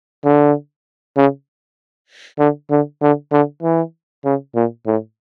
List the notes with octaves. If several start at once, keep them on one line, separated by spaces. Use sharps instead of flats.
D3
C#3
D3
D3
D3
D3
E3
C#3
A#2
A2